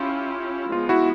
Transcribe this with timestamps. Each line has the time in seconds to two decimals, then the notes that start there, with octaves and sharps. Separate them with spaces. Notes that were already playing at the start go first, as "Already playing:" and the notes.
Already playing: C#4 E4 F4 G4
0.72 F3 G#3 B3 F4
0.89 E4 F#4